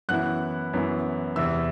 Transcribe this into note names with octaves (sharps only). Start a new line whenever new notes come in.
F#2 E3 B3 E4 F#5 F#6
F#2 E3 B3 E4
E2 C3 E3 E5 E6